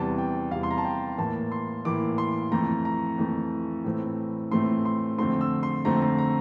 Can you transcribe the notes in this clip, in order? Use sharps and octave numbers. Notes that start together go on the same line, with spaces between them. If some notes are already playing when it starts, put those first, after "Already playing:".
Already playing: E2 C3 G3 A5
G5
E2 C3 G3 F5
C6
A#5
A5
G5
A2 E3 A#3 A5
C6
A2 E3 A#3 D6
C6
F2 E3 A3 A#5
A#5
F2 E3 A3
A2 E3 A3 C4
A2 E3 A3 C4 C6
C6
F2 D3 A3 C4 C6
E6
C6
F2 D3 A3 C4 A#5
A#5
A#5